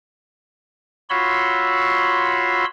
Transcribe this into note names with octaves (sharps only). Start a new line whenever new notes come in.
F4 F#4 C#5 B5 C6 E6